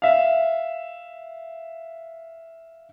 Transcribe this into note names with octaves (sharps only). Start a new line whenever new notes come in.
E5 F5